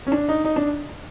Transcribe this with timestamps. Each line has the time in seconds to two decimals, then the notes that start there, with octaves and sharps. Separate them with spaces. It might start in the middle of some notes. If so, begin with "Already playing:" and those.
0.07 C#4
0.12 D4
0.29 D#4
0.45 D#4
0.56 D4